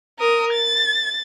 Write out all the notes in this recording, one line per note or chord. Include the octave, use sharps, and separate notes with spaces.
A#4 D#6
A6